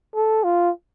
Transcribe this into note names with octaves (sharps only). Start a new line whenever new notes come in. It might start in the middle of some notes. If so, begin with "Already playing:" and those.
A4
F4